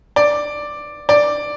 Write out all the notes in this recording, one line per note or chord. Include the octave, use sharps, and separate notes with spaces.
D5
D5